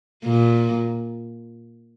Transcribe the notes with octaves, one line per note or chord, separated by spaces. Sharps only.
A#2